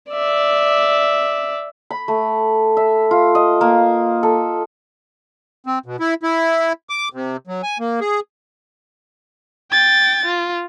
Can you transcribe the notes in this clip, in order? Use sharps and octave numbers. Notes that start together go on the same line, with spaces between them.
D5 E5
B5
A3
E5
F4
D#5
A#3
A4
C4
B2
E4
E4
D6
C3
F#3
G#5
A#3
G#4
G5 A6
F4